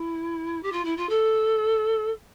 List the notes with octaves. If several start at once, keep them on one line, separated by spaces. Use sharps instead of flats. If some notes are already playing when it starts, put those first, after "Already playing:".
Already playing: E4
G4
F4
E4
F4
A4